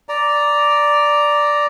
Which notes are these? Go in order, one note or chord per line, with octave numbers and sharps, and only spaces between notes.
D5 A#5